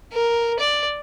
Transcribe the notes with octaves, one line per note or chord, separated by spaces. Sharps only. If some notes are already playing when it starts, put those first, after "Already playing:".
A#4
D5